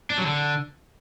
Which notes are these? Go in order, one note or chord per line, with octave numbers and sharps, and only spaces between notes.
D4
F#3
D3